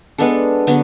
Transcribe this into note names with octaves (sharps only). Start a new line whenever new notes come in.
G#3 B3 D4 A4
D3 F#3 B3